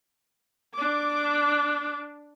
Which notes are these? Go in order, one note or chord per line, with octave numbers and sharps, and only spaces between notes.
D4 D6